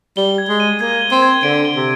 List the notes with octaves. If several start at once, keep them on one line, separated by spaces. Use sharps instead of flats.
G3 G7
G#6
G#3
D#7
A#3 G#6
G7
C4
G#6
D3 D7
G7
C3